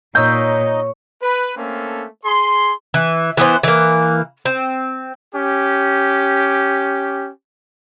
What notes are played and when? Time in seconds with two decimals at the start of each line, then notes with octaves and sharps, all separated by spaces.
0.15 A#2 D#4 C#5 D#5 E6 G6
1.22 B4
1.56 A3 A#3 C4 C#4 A4
2.24 G#4 C6
2.94 E3
3.37 E3 B3 C5
3.63 E3 A#3
4.45 C4
5.34 C#4 G4